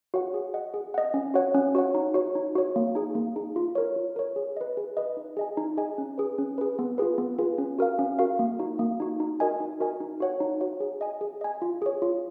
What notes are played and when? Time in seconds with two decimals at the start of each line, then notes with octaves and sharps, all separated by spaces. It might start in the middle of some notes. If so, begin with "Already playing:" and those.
0.14 F#4 C#5 F#5
0.34 G#4
0.54 D#5 F#5
0.74 G#4
0.94 D#5 F#5
1.14 C#4
1.34 F#4 C#5 F#5
1.54 C#4
1.75 F#4 C#5 F#5
1.95 D#4
2.14 F#4 C#5
2.35 D#4
2.55 F#4 C#5
2.76 A#3
2.95 D#4 G#4
3.15 A#3
3.36 D#4 G#4
3.56 F4
3.75 A#4 C#5
3.96 F4
4.16 A#4 C#5
4.36 G#4
4.57 B4 D#5
4.77 G#4
4.97 B4 D#5
5.17 D#4
5.37 G#4 D#5 G#5
5.57 D#4
5.77 G#4 D#5 G#5
5.98 C#4
6.18 G#4 B4
6.38 C#4
6.58 G#4 B4
6.79 B3
6.98 F4 G#4 B4
7.18 B3
7.38 F4 G#4 B4
7.58 C#4
7.79 F#4 A#4 F5
7.99 C#4
8.19 F#4 A#4 F5
8.39 A#3
8.59 D#4 F#4
8.79 A#3
9.00 D#4 F#4
9.20 D#4
9.40 F#4 A#4 D#5 G#5
9.60 D#4
9.80 F#4 A#4 D#5 G#5
10.00 D#4
10.20 F#4 C#5 F#5
10.40 D#4
10.61 F#4 C#5 F#5
10.80 G#4
11.01 D#5 G#5
11.21 G#4
11.41 D#5 G#5
11.62 F4
11.82 G#4 C#5
12.02 F4